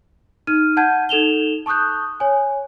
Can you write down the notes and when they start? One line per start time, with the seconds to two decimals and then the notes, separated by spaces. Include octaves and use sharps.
0.47 D#4 F6 D#7
0.77 F#5 A5 G6 G#6 D#7
1.09 D#4 A4 E7 F7 G7
1.66 A5 C#6 D#6 F#6 G6
2.20 C#5 G#5